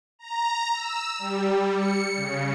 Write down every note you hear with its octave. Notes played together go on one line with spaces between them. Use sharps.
A#5
E6
G3
C#7
C#3